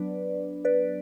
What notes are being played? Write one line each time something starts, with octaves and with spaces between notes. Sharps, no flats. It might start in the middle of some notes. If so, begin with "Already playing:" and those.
Already playing: F#3 B3 D4 B4 D5
B4 D5